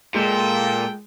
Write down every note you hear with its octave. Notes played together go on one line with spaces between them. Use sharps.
A#2 G#3 A4 G5